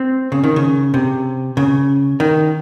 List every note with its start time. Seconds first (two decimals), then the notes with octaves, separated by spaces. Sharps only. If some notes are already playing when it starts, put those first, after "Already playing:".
Already playing: C4
0.32 C#3
0.44 D#3
0.56 C#3
0.94 C3
1.57 C#3
2.20 D#3